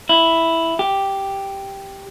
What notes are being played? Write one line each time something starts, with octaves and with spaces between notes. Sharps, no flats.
E4
G4